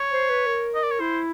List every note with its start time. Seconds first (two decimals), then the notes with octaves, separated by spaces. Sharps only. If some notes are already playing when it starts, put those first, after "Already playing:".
Already playing: C#5
0.11 C5
0.29 B4
0.46 A#4
0.75 D#5
0.83 D5
0.91 C#5
1.00 E4 C5